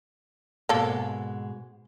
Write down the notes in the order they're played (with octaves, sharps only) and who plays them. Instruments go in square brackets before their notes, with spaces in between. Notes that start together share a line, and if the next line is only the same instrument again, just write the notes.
[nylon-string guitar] G#2 B2 G#3 [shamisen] A#3 A4